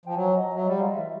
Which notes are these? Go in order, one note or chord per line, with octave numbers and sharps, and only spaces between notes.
F3 G5
F#3 G#5
D#5
F#3 E5
G3 F#5
G#3 F5
D#5
E3 E5